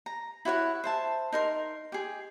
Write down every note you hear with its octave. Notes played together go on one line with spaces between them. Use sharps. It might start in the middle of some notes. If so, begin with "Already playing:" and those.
A#5
E4 F#4 C#5 F#5
C5 E5 A5
D#4 A#4 C6
G4 G#4